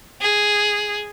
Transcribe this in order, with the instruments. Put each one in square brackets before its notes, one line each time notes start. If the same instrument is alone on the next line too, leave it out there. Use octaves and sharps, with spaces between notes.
[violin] G#4